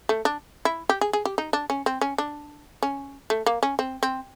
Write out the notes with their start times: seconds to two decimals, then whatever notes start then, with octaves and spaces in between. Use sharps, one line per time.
0.09 A3
0.25 D4
0.65 E4
0.89 G4
1.01 G#4
1.13 G#4
1.25 G4
1.38 D#4
1.53 D4
1.70 C#4
1.86 C4
2.01 C#4
2.18 D4
2.82 C#4
3.30 A3
3.46 A#3
3.63 C#4
3.79 C4
4.03 C4